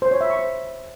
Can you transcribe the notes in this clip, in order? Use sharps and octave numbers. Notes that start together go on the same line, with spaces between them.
C5
C#5
E5
C#6
C5